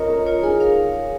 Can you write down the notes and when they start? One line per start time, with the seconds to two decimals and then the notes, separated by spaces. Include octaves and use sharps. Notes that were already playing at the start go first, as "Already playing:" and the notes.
Already playing: C#4 F4 A#4 C#5 D#5 A#5
0.10 C#4 A#4
0.26 F4 C#5
0.43 D#4 G#4
0.60 A#4 C#5 F5